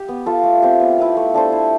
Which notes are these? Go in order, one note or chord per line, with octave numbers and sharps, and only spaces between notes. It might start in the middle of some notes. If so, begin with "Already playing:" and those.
Already playing: G4
B3
F4 A4
A3
C4 G4
B3
E4 B4 F5
A3
D4 A4 C5
E4